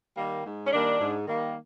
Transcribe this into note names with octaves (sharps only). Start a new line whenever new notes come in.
D#3 G3 A#3
G#2
C#4
D#3 G3 A#3 D4
G#2
D#3 G3 A#3